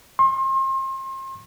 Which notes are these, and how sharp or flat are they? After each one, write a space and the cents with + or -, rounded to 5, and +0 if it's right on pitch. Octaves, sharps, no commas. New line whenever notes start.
C6 +35